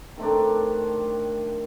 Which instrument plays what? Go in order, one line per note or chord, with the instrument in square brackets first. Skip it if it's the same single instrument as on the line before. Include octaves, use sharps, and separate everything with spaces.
[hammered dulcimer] D#3 A3 C4 D4